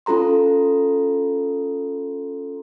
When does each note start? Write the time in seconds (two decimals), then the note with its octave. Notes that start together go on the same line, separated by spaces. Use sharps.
0.06 C#4 F4 A4 A#5 C6